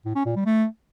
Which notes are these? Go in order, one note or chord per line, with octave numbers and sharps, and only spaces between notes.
A2
C#4
A#2
G3
A3